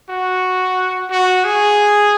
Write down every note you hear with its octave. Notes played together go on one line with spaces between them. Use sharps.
F#4
F#4
G#4